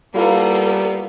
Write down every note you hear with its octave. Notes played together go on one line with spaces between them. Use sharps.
G3 A#3 B3 E4 F4 A4 A#4